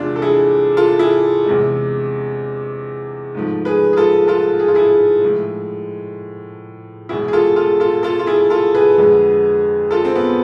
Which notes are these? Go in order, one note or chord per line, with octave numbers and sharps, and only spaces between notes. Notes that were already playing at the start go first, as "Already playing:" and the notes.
Already playing: E2 C3 E3 G#3 D4 F4
A4
E4 G#4
F4 A4
E4 G#4
E2 C3 G#3
G#2 F3 A3
G#4 B4
G#4
F4 A4
F4 A4
G#4
F4
E4 G#4
A2 F3 G#3
E2 B2 G#3 E4 G#4
G#4
F4 A4
F4 A4
F4 A4
F4 A4
F4
E4 G#4
F4 A4
G#4 B4
F2 D3 G#3
F4 A4
C4
B3